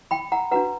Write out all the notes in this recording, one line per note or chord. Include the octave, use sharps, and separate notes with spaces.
G5 B5
F#5 A#5
D4 F#4 B4 F#5 A#5